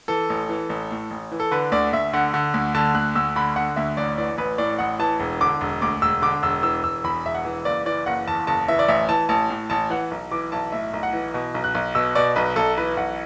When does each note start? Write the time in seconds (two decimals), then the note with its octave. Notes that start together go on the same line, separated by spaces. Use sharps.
0.08 E3 A4
0.30 A1
0.49 E3
0.70 A1
0.91 A2
1.11 A1
1.32 E3
1.40 A4
1.51 D3 B4
1.72 D2 D5
1.93 D2 E5
2.13 D3 F#5
2.34 D3
2.54 D2
2.75 D3 A5
2.94 D2 F#6
3.15 D2 E6
3.36 D3 B5
3.56 D3 F#5
3.76 D2 E5
3.97 A1 D5
4.18 E3 D5
4.38 A1 B4
4.58 A2 D5
4.79 A1 F#5
4.99 E3 A5
5.20 E1
5.40 D3 D6
5.61 E1
5.82 D2 D6
6.02 E1 E6
6.22 D3 D6
6.43 E1 E6
6.63 E3 E6
6.83 E1 E6
7.04 E2 B5
7.24 E1 E5
7.35 F#5
7.45 E3
7.65 F#1 D5
7.85 E3 D5
8.06 F#1 F#5
8.28 E2 A5
8.47 F#1 A5
8.68 E3 E5
8.79 D5
8.88 A1 E5
9.09 E3 A5
9.29 A1 A5
9.50 A2
9.70 A1 A5
9.90 E3 F#5
10.11 B1
10.31 E3 D6
10.52 B1 A5
10.72 A2 E5
10.93 B1
11.03 F#5
11.13 E3
11.34 B2
11.54 B1
11.64 F#6
11.75 B1
11.95 B2 E6
12.15 B2 D5
12.36 B1 B4
12.56 B1 A4
12.77 E3 B4
12.97 B1 F#5